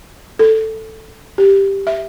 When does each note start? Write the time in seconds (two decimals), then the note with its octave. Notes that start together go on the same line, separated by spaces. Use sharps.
0.39 A4
1.38 G4
1.87 E5